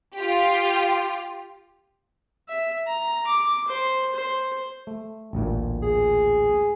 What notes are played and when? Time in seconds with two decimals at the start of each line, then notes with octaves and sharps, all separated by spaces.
0.17 F4 G4
2.49 E5
2.88 A#5
3.27 D6
3.68 C5
4.15 C5
4.87 A3
5.33 A1 D2 A#2
5.82 G#4